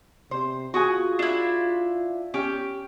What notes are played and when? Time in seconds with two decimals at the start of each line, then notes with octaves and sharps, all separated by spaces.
0.31 C3 C5
0.74 F4 F#4 G#4 G#5
1.19 D4 E4
2.34 C#4 G4